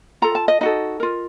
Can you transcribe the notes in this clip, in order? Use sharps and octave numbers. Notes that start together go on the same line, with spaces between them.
F4 A4 A#5
A5
D#5
D#4 F#4 A4 D#5
F4 A#4